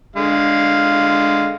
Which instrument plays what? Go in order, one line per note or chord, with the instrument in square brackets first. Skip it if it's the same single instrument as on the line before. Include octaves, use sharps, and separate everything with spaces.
[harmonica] D3 G#3 F5